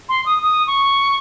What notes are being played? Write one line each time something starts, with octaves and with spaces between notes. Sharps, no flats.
C6
D#6
D#6
C#6